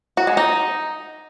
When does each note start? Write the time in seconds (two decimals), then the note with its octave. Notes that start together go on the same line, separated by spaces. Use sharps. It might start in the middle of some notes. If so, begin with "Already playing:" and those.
0.17 F#4
0.27 G#3
0.37 D#4